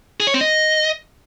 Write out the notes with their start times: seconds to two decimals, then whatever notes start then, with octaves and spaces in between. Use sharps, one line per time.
0.20 G#4
0.27 C#5
0.34 C4
0.41 D#5